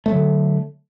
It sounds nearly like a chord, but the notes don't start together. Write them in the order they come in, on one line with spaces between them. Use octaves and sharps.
A3 F#3 D3